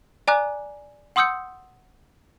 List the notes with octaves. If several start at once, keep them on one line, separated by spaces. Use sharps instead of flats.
D5 G#5 A#5 D6 F#6
F#5 C6 D#6 E6 G6 C#7